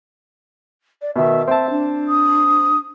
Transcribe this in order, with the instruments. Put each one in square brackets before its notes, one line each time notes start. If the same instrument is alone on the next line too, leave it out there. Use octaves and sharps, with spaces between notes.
[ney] D5
[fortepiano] B2 D#3 [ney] E5
[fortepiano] C4 A5 [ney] E5
[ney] D4
[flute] D#6